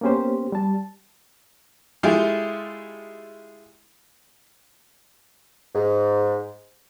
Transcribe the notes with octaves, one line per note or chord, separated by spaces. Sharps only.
A#3 B3 C#4 G4 C5
G3 A5
G#3 A3 E4 F4 G4
G#2